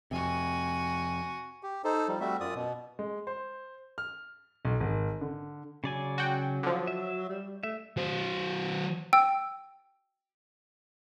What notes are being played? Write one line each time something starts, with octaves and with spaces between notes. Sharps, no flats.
F2 C3 F#4 G#5
G4
D#4 A4 C5
F3 G3
G3 A3 C4 F#4 E5
F#2 F4 D5 D#6
B2
G#3
C5
F6
B1
G#1
D3
C#3 F#3 D5 G#5
F#4 G5
D3 F3
E5
G3
A3 E5
F#3 C5
G5 E6